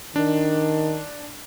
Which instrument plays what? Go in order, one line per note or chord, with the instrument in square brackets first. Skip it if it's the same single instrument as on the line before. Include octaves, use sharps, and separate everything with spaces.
[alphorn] D#3 [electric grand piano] D4